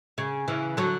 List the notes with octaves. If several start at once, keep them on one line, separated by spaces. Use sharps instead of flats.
C#3
C#3 E3
D3 F#3